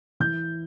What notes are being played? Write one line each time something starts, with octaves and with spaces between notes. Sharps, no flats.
E3 G6